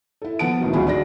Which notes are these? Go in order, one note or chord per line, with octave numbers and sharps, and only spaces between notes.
E4 A4
F3 B3 F#5 A5 D7
G1 A2 D#3 E3 F#3
G#1 D2 F#3 F4 G#4 B5
D3 F#3 D5 A#6